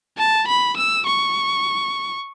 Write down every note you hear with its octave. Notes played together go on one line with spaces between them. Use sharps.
A5
B5
E6
C#6